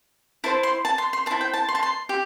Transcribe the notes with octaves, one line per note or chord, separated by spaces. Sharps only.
E4 C5 A5
C6
A5
C6
C6
E4 C5 A5
G5
A5
C6
A5
C6
G4